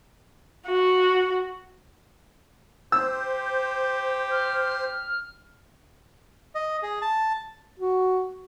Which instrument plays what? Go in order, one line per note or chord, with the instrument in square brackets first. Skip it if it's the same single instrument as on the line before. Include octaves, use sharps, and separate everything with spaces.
[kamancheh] F#4
[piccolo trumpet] G4 [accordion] C5 [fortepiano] E6
[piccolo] F6
[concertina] D#5
G#4
A5
[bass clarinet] F#4